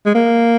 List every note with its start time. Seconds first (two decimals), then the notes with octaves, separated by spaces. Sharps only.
0.06 G#3
0.15 A#3